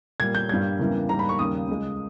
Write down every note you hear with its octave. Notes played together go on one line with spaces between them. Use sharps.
A#2 G3 A#3 G#6
G6
G2 G3 A#3 G#6
E2 C#3 E3 G3 A#3
G#2 G3 A#3 A#5
B5
C#6
D#2 C#3 G3 A#3 D#6
C#2 C#3 G#3